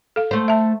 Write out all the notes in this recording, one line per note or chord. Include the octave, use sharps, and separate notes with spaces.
A4 F5
A3 C5
E5 A5